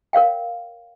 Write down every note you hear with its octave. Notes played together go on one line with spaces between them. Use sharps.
A#4 C#5 F5 G5